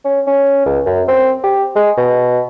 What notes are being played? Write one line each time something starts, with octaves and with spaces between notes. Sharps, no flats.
C#4
C#4
C#2
F#2
C4
G4
G#3
B2